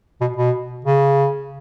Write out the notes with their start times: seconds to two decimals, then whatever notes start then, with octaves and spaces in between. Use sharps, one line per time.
0.21 B2
0.37 B2
0.85 C#3